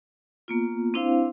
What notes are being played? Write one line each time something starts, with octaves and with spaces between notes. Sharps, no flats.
A#3 B3 F4
C4 D4 E4 C5 F5